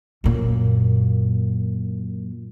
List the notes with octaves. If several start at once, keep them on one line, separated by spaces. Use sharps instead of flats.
F#2 A#2